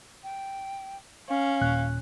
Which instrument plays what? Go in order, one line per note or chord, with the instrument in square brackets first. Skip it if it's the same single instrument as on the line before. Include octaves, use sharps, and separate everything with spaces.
[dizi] G5
[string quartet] C#4 [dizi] F5
[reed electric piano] D#2 A#2 F#6